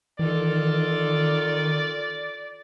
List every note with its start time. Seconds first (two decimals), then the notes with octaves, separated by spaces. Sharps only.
0.19 D#3 E3 F4 A4 D5